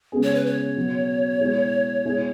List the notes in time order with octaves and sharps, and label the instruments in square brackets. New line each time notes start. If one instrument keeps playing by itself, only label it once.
[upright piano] C#3 G#3 B3 G#4
[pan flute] C#5
B4
C#5
[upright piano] B2 F#3 B3
B2 G#3 E4 G#4
B2 G#3 E4 G#4